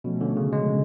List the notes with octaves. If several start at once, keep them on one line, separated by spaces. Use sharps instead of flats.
B2 F3 A3 C#4
D3
C#3
G#3
C#3